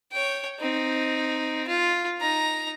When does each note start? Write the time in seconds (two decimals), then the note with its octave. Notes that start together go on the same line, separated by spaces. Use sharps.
0.12 C#5 G5
0.60 C4 D#4
1.68 F4
2.20 D#4 A#5